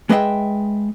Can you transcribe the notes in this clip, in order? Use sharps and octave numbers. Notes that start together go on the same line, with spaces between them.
G#3 B4 D#5 E5 G5